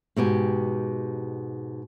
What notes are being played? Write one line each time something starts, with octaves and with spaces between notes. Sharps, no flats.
G#2 B2 G4 G#5